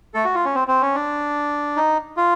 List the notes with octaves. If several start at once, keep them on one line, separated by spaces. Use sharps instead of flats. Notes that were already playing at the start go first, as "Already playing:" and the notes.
A3 A4
F#4
F4
C#4
C4
C4
C#4
D4
D#4
F4